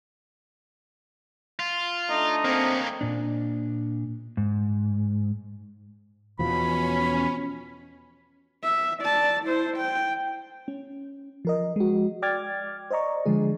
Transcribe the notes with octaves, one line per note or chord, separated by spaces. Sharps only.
F4
A3 D4 D#4
A#3 C4 C#4
A#2 D4
G#2
E2 B2 F3 C#4 B5
E5
D5 A5
E4 C5
G5
C#4
F3 A#4 D#5
G#3 F#4
D5 G5 D6 F6 G#6 A6
C5 D5 D#5 A#5 C#6
D3 F3 G#3 G#4